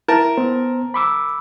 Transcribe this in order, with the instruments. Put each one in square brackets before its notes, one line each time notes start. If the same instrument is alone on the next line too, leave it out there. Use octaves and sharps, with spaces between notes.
[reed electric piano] E4 [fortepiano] A#4 A5
[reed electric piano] B3 C5
B5 D6 E6